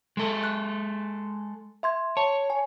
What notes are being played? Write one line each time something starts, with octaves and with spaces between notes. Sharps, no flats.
G#3 A4
F#6
E5 C6 G#6
C#5 A5
G#5